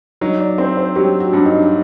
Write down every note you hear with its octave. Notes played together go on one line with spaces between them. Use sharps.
F#3 D#4
D5
C4 C5
C5
F#3 G4
F#4
G2
D#4